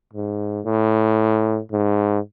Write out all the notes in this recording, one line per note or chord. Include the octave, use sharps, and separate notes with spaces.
G#2
A2
G#2